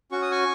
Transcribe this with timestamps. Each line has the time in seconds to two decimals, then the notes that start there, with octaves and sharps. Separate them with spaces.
0.12 C#4 F#4 C#6
0.22 D#6
0.31 G#5 C#6